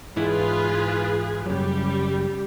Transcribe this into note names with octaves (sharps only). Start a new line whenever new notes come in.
G#2 E3 E4 F4 G#4 B4
F#2 C#3 G3 G4